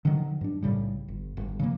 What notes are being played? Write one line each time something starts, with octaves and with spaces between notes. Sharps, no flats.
D3 D#3 F3 F#3
G2 D4
B1 A2 C#3 G3
G1
G1
C#3 F3 A3 A#3